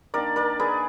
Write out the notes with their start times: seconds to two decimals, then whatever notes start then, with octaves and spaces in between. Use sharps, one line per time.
0.14 D#3 A#3 D4 A#4 D5
0.36 A#4 D5
0.60 G#4 B4